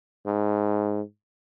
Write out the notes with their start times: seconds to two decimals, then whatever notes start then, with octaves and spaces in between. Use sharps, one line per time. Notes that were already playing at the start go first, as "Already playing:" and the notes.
0.26 G#2